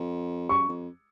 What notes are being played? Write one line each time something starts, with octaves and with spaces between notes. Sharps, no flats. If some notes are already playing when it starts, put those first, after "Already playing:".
Already playing: F2
F#2 C#6
F2